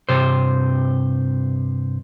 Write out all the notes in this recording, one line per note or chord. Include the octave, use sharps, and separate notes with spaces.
G2 C3 C5